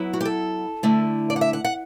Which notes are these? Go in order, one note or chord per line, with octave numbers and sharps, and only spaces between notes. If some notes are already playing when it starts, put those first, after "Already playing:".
Already playing: F#3 B3 E4
F#4
G4
A4
D3 A3 E4
D5
F#5
E5
F#5
F#5